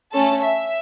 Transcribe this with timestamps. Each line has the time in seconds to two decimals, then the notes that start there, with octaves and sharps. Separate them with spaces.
0.13 A3 C#4 A4 A5
0.42 E5